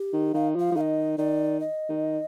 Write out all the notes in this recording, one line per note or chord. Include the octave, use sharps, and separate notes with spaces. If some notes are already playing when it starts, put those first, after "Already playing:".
Already playing: G4
D#3
D#3 F5
F3 F5
F3
D#3 D#5 F5
D#3 D5
D#5
D#3